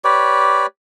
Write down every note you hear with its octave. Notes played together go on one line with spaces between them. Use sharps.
G4 B4 C#5 D5